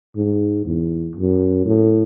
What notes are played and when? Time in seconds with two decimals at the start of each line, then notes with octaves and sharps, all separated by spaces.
0.16 G#2
0.65 E2
1.16 F#2
1.66 A2